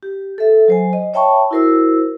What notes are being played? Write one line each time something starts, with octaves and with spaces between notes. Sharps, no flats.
G4
A4 E5
F#3 C5 G#5
D#5
C#5 E5 G5 A5 B5 C#6
E4 F#4 A#4 C5 E6